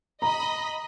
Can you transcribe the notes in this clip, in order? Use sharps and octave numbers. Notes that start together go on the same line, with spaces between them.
D#5 A#5 B5